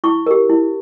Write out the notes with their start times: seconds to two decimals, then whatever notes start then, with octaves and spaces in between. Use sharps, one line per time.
0.04 E4 C#6
0.26 G4 A#4
0.49 E4